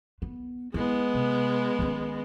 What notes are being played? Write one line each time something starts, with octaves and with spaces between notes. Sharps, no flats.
B3
G#3 B3 E4
C3
D#3 C#4